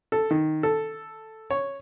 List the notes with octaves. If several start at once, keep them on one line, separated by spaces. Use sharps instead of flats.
A4
D#3
A4
C#5